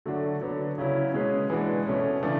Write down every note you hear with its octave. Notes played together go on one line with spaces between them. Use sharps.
D3 F#3 A3 D4 F#4
D3 F#3 B3 D4
C#3 F#3 C#4 E4
B2 G#3 C#4 G#4 B4
E3 G#3 B3 D4 F#4
B2 A3 C#4
C#3 E3 A3 D4